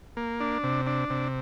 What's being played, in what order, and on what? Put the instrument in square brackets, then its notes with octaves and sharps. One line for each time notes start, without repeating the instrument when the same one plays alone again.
[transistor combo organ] A#3
D4
C3
D4
C3